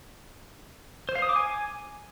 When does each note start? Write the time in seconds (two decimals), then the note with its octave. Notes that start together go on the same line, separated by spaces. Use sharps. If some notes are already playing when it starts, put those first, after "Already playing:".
1.09 C5
1.15 F5
1.22 D#6
1.29 D6
1.36 G#5